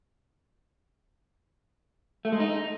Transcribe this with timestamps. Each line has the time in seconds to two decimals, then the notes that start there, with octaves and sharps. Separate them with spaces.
2.25 A3
2.32 G#3
2.40 D#4